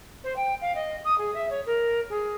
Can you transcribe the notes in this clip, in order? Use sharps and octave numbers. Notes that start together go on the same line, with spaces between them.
C5
G5
F5
D#5
D#6
G#4
E5
C#5
A#4
G#4